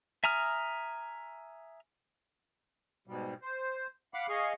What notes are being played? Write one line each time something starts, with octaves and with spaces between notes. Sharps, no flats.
E5 G#5 A#5 D#6 F6
G#2 B2 G3
C5
F5 F#5 B5 D6
G#4 D#5 F5 C#6